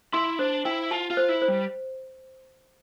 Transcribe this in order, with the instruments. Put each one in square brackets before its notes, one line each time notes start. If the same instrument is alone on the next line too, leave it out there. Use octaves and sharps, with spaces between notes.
[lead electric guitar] E4 [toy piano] C6
[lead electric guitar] D4 [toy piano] C5
[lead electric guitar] E4 [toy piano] G5
[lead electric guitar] F4 [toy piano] A5
[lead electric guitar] F4
[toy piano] C5
[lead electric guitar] E4
[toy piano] C5
[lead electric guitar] G3